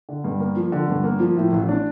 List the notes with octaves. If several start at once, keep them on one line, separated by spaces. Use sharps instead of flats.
D3
G2
A#3
F3
D3
G2
A#3
F3
A2
A1
D4